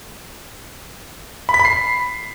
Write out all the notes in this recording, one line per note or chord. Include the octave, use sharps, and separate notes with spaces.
B5
B6
B5
C7